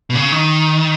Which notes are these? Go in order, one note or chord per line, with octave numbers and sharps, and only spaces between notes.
B2
C#3
D#3